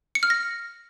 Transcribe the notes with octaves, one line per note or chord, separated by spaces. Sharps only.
C#7
F6
A#6